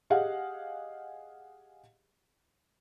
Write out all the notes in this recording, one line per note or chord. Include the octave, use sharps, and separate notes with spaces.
G4 G#4 D#5 F5 F#5